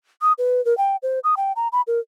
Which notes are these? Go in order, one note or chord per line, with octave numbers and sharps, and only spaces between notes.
D#6
B4
A#4
G5
C5
D#6
G5
A#5
B5
A#4